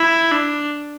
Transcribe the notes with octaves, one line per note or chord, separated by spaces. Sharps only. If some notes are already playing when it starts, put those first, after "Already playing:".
Already playing: E4
D4